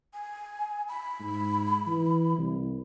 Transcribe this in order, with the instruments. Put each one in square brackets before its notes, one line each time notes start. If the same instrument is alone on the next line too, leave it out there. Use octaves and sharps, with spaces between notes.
[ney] G#5
B5
[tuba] G#2
E3
C2